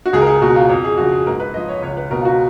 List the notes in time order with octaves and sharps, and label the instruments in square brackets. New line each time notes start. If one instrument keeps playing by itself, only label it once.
[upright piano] F#4
C#2 G#4
A#4
G#4
B2 F#4
F4
F2
G#4
C#3 F3 F#4
G#4
G#2 A#4
B4
F3 D#5
C#5
C#2 C#5
B4
B2 A#4
F4
F#4